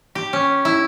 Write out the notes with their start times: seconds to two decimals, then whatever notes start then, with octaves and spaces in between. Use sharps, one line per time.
0.15 G4
0.33 C#4
0.65 E4